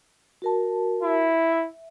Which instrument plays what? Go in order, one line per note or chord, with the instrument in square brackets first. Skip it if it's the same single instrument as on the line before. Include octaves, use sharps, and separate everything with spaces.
[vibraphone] F#4 A#4 A5
[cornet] E4
[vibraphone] E5